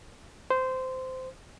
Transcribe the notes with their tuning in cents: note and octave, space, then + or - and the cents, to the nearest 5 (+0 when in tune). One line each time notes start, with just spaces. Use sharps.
C5 -15